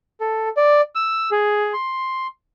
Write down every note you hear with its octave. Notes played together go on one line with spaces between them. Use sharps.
A4
D5
E6
G#4
C6